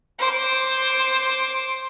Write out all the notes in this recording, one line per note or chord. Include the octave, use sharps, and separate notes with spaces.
C5 D6